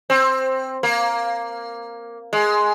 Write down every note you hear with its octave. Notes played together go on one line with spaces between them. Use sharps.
C4
A#3
G#3